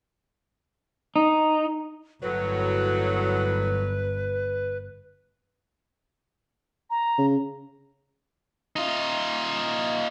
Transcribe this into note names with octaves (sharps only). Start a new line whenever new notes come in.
D#4
G1 A2 F#3 B4
A#5
C#3
D#4 F4